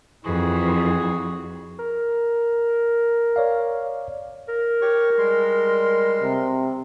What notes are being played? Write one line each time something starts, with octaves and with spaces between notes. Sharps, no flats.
F2 E3 F#4 G#4
A#4
C#5 D5 F5
A#4
G4 C#5 C#6
G3 G#3 C6
C3